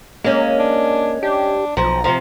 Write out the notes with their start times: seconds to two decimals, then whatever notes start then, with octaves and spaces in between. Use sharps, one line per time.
0.24 G#3 A#3 C#4
0.59 D4
1.23 D4 G4
1.77 B1 F3 A#5
2.04 C3 F3 A#5